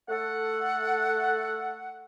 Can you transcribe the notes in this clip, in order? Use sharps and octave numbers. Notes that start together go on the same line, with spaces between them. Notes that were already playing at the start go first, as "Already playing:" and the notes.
A3 A4 F#5